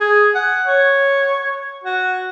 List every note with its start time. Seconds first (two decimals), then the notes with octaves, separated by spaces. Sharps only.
0.01 G#4
0.35 F#5
0.66 C#5
1.84 F#4